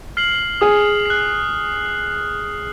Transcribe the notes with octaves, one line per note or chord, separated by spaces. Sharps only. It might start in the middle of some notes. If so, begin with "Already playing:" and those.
F6 C7 F#7
G#4 D#6
F#6 C7